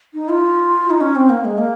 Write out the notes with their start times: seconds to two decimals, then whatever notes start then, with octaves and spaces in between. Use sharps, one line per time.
0.14 D#4
0.29 F4
0.90 D#4
1.01 C#4
1.16 C4
1.29 A#3
1.45 G#3
1.58 A#3